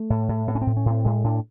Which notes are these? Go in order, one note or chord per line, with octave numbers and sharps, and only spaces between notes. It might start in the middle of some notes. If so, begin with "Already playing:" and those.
Already playing: A3
A2
A2
A2 B3
C#4
C4
A2
C#4
A2 C4
A2 G#3
A2 D4